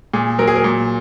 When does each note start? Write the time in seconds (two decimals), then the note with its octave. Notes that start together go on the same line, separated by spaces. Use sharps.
0.14 A#2 G#4
0.39 F#3 A#4
0.47 G#4
0.56 A#4
0.64 A#2